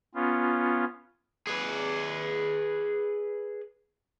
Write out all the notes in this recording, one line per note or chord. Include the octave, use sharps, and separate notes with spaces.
B3 C#4 F4
G#4 B4